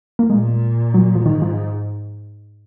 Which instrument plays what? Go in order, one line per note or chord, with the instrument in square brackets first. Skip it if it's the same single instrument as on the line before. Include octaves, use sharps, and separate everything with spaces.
[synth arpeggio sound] A#3
[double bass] A#2 [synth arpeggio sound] G#3
[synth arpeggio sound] F#3
F3
[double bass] G#2 [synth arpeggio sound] D#3
[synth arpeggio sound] F3